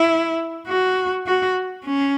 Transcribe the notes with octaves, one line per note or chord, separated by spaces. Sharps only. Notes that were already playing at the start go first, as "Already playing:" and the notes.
Already playing: E4
F#4
F#4
C#4